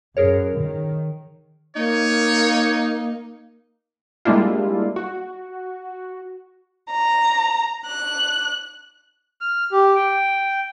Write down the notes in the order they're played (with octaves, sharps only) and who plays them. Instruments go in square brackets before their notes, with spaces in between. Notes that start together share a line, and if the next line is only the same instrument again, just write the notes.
[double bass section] F#2 [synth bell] G#4 A#4 C#5
[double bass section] D#3
[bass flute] A#3 [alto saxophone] D#4 [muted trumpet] C#5
[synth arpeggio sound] G3 G#3 A#3 D4 E4 F4
F#4
[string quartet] A#5
F#6
[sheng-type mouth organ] F6
G4
G5